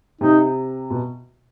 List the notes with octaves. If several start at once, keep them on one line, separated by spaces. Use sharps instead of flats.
C3 D#4
B2